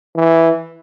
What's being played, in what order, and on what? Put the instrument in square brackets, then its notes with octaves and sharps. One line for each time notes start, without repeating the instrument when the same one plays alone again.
[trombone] E3